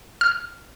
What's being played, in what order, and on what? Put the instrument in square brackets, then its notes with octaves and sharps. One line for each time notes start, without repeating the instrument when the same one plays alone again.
[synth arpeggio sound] F6